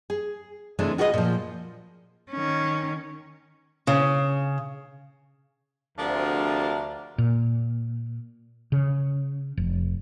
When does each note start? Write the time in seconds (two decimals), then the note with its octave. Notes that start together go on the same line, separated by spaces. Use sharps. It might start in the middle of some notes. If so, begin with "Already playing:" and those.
0.10 G#4
0.79 C3 E3 G#3 A3 D4
0.98 F4 F#4 G#4 B4 C#5 D#5
1.14 A#2 F3
2.31 D#3 C#4
3.87 C#3
5.98 D2 C3 F3 G3 D4 A#4
7.18 A#2
8.72 C#3
9.57 F1